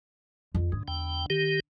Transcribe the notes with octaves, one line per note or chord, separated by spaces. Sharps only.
F2
G#2 D3
E2 G5
D#3 G4